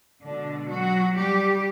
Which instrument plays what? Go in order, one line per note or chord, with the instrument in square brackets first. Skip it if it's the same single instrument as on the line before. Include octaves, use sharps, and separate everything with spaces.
[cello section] B2 D3 G#3 D4
F#3 F#4
G3 G4